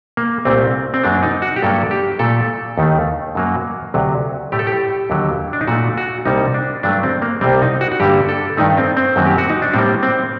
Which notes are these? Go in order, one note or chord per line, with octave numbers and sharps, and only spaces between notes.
A#3
C2 A#2 A3 C4
C4
F#2 F#3 A#3 D4
D#4
F#4
G4
G2 F#3 A#3 A4
G4
A#2 A3 A4
D#2 D#3 A3
F#2 F#3 A#3
D2 C3 F#3
A2 A3 G4
A4
G4
D#2 D3 F#3
D4
D#4
A#2 A3 F#4
F#4
C2 C3 G3 A#3 D#4
D4
G2 F#3 A3 D4
C4
A#3
C2 C3 G3 C4
D#4
F#4
F#4
G2 D3 G3 A#3 G4
A4
G2 D#3 A3 D#4
C4
C4
F#2 D#3 F#3 A#3
G4
F#4
D#4
D4
A2 G3 A#3 C4
C4